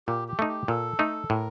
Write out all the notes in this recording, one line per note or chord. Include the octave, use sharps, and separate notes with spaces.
A#2 G4
G4
A3 D#4
G4
A#2 A4
A3 D#4
A2 A#4